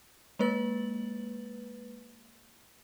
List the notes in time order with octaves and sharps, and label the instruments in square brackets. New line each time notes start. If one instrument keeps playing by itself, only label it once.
[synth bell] G#3 A#3 B4 A6 F#7